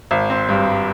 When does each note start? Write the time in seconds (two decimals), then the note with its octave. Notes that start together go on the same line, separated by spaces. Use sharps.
0.11 G#1
0.30 C4
0.49 G2
0.68 G3